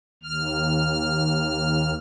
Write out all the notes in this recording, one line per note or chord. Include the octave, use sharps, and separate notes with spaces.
D#2 F6